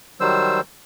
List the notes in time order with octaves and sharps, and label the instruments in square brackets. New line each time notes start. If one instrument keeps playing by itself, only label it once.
[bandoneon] D#3 F#3 G3 C5 E6